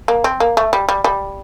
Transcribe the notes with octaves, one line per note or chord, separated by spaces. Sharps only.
A#3
C4
A#3
A3
G3
G3
G3